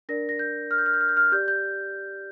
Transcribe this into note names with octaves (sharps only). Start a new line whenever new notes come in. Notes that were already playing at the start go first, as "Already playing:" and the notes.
D4 A#4 D5 A#6
A#6
G6
F6
G6
F6
G6
F6
G6
F6
G4 D5 G6
G6